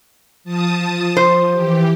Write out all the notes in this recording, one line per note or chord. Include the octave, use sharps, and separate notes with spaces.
F3 A5 D#6
F3 C5
E3 G4